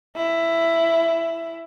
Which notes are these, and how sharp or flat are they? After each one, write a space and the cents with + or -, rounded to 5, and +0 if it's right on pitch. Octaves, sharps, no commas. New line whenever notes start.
E4 +10